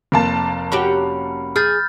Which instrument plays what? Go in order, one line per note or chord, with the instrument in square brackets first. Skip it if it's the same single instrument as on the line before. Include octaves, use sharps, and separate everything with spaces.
[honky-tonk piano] F1 A#3 A5
[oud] C#4 F#4 G4 [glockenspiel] B5
[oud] G#4 [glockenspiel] F6 G6 A6